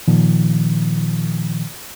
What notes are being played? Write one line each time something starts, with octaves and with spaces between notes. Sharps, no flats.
A#2 D#3 F3